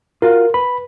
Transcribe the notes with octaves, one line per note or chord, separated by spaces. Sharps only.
F4 F#4 A#4 F5
B4 B5